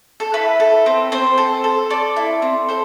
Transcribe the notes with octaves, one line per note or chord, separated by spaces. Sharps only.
A4
E4 B4
A4
C4
C4 C5
A4
A4
A4 D5
E4
C4
A4 C5